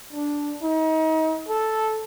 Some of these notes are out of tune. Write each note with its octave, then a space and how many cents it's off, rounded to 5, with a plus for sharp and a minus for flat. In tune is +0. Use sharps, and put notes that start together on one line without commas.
D4 -5
D#4 +35
A4 -5